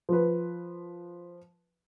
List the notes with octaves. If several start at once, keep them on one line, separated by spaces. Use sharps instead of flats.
F3 B4